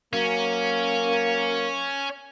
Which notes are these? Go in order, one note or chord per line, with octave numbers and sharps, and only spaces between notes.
F#3 A#3 C#4